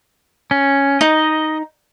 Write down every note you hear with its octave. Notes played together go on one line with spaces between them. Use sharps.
C#4
D#4 D#5